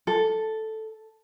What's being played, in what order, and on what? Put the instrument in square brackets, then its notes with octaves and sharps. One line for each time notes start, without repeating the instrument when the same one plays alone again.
[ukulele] A4